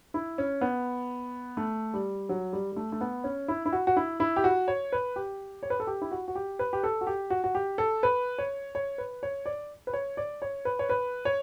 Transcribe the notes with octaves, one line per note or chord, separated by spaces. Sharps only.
E4
C#4
B3
A3
G3
F#3
G3
G3
A3
A3
B3
C#4
E4
E4
F#4
F#4
E4
E4
G4
F#4
C#5
B4
G4
C#5
B4
A4
G4
E4
F#4
F#4
G4
B4
G4
A4
F#4
G4
F#4
F#4
G4
A4
B4
C#5
C#5
B4
C#5
D5
B4
C#5
D5
C#5
B4
C#5
B4
C#5